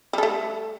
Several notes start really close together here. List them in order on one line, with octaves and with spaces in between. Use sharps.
G3 A4 A3